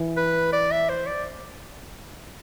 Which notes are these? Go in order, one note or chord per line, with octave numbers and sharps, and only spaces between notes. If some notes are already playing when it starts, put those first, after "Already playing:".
Already playing: E3
B4
D5
E5
C5
D5